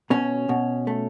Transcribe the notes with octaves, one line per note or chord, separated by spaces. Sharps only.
B2 C#4
B2
A3